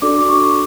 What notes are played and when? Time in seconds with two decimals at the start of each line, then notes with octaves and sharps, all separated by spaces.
0.02 D4 F#4 A4 D5 D6
0.19 D6
0.29 C#6